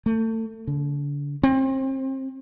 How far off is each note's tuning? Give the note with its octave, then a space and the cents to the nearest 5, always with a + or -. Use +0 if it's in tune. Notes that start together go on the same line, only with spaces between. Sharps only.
A3 +30
D3 -35
C4 +30